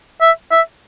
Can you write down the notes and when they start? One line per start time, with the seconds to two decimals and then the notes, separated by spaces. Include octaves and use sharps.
0.21 E5
0.52 E5